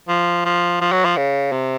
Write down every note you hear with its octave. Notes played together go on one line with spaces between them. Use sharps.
F3
F3
F3
F#3
F3
C#3
C3